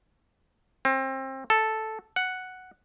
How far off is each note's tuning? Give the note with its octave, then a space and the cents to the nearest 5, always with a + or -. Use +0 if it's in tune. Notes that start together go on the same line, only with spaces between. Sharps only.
C4 +30
A4 -5
F#5 +0